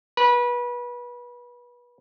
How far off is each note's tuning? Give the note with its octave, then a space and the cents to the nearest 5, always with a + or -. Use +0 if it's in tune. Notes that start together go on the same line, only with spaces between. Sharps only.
B4 -25